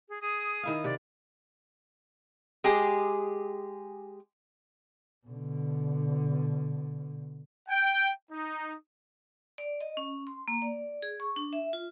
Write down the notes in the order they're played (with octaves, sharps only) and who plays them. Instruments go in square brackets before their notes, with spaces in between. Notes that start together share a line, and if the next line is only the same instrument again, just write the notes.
[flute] G#4
[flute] G#4 [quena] D#6
[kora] D#3 E4 F5
[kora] C3 G4 [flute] D5
[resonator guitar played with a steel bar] G#3 G4 G#4
[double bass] B2 D3
[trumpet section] G5
D#4
[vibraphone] D5
D#5
C#4
C6
A#3
D5
G#4
C#6
D4
E5
F4